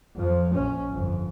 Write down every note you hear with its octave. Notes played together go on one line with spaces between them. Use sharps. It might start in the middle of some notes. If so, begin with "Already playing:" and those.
F2 F3
A#1 C#4
G1 F2